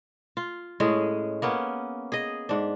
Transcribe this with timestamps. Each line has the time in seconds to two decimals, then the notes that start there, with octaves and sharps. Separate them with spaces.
0.37 F4
0.80 A2 G#3 C#4 G#4
1.42 A#3 B3 C#4
2.12 G#4 D#5
2.49 G#2 D4